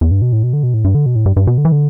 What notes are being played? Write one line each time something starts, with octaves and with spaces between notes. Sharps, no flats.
E2
G2
B2
A2
B2
D3
B2
A2
G2
D3
B2
A2
G2
G2
B2
D3
E3
D3